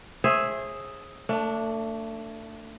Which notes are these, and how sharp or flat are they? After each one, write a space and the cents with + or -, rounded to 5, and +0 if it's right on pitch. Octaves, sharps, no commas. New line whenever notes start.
G#4 +0 C5 +45 E5 +0
A3 +30 D4 +0